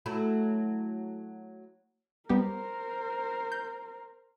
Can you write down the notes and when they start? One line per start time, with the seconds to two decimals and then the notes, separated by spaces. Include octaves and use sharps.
0.06 F#3 A3 E4
2.29 G3 B3 G4 A#4 C5
3.52 G6